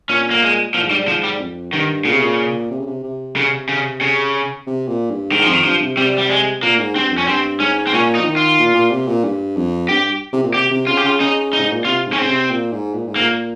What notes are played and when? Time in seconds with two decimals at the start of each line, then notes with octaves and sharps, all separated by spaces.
0.09 A#2 C#4
0.31 A#3
0.43 G#3
0.74 A#2 F3
0.82 G#2
0.90 G2 G3
0.98 G#2
1.08 F3
1.24 G3
1.39 F2
1.73 G2 D#3
2.05 A#2 C#3
2.13 C3
2.21 A#2
2.71 C3
2.79 C#3
2.87 C3
3.03 C3
3.36 C#3
3.69 C#3
4.01 C#3
4.67 C3
4.88 A#2
5.11 G2
5.32 G#2 D#3
5.42 F3
5.48 F2 D#3
5.65 G2 F3
5.81 C3
5.97 C3 G3
6.18 G3
6.30 G#3
6.62 A#2 A#3
6.79 G#2
6.96 G2 C4
7.11 F2
7.18 C#4
7.28 G2 C4
7.60 G#2 C#4
7.87 C4
7.93 A#2 C#4
8.15 D#4
8.20 F3
8.26 D#3
8.37 F4
8.59 A#2
8.74 A#2
8.91 C3
9.08 A#2
9.24 G2
9.56 F2
9.89 G2 G4
10.33 C3
10.43 A#2
10.54 C3 G4
10.71 C3
10.87 C#3 F4
10.97 G4
11.04 C#3 F4
11.20 C#3 D#4
11.53 D#4
11.59 G#2
11.72 A#2
11.85 C3 F4
12.07 G#2
12.13 C#4
12.18 C#3 C4
12.29 C3
12.51 A#2
12.72 G#2
12.94 A#2
13.07 G#2
13.16 A#2 A#3